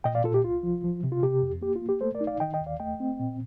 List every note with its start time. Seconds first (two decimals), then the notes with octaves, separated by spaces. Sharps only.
0.04 A#2 D#5 G5
0.15 D5 F5
0.24 A#2 F4 A4
0.34 G4
0.44 C2 F4
0.63 F3
0.84 F3
1.04 C3
1.12 F4
1.23 C3 G4
1.42 F2
1.61 A#3 G4
1.76 F4
1.82 A#3
1.89 G4
2.01 A3 A4 C5
2.14 A#4 D5
2.21 D#4
2.27 D5 F5
2.40 D#3 D#5 G5
2.54 D#5 G5
2.61 D#2
2.66 D5 F5
2.80 A3 D#5 G5
3.00 C4
3.19 A#2